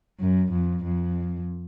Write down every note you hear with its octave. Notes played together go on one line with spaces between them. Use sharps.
F#2
F2
F2